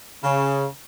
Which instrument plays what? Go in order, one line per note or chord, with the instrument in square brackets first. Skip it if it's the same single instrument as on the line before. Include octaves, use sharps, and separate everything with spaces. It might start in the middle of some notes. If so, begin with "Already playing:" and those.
[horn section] C#3